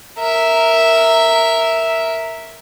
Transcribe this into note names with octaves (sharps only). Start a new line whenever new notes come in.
A#4 E5